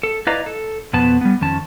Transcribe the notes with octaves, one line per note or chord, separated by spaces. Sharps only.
A4
E4 B4 D5 D#5 F5 A#5
A4
F2 B2 B3 B4 A5
G3 B3
F2 D#3 C#4 A5